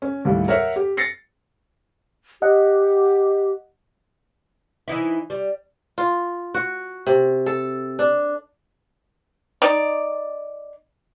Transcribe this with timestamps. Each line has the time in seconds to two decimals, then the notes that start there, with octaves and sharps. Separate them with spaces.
0.02 C#4
0.25 D#2 A2 G3
0.48 A#4 C#5 E5 F#5
0.76 G4
0.97 A6 A#6 C7 C#7
2.42 G4 D#5 F#5
4.88 E3 D#4 E4
5.30 G3
5.98 F4
6.54 F#4
7.07 C3
7.46 A4
7.99 D4
9.62 D#4 D5